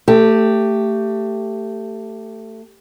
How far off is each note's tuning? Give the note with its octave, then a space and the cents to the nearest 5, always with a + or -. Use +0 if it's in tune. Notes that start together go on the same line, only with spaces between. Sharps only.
A3 +20 G4 +0